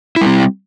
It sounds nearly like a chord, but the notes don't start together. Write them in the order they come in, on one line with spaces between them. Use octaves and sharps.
E4 G3 C4